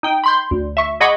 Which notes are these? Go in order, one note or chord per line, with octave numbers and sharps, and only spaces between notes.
D#4 G5
B5 C6 G6
D2
E5 C#6
G#4 D#5 F#5 B5 C#6 D6